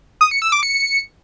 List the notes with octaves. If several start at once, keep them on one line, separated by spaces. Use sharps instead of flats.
D#6
C#7
E6
D6
C#7